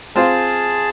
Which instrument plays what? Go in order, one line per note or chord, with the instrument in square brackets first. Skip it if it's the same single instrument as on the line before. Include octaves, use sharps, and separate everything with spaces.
[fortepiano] C4 F4 C5 [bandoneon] G#4 A5